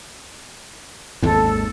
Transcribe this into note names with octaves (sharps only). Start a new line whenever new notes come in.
G#1 D#2 G#2 A4